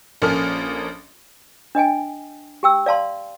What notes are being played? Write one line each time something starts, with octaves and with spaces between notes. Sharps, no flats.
A#1 A#3 C#4 A4 F6
D4 D#5 G5 G#5
G4 G5 E6
D5 F5 A5 C6